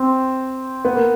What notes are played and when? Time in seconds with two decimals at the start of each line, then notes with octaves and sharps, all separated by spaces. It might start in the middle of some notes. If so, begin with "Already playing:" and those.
Already playing: C4
0.85 B3
0.95 A#3